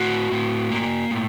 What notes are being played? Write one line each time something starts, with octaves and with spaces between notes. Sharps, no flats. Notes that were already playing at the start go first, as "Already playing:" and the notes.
Already playing: A2 F#4
A2
A#3
A2